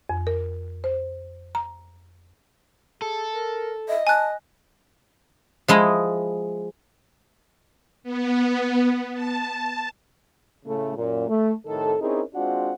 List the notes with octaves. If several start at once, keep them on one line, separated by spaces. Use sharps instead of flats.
F2
A#4
C5
A#5
G#4 A4
A#4
D#5 E5
G#5 A5 F#6
F3 G#3 E4 D#5
B3
A5
A2 C#3 A3
F#2 A#2
A3
A2 C3 D#3 A4
C4 C#4 D#4 E4 G#4 A#4
G#3 C4 D4 F4 F#4 F#5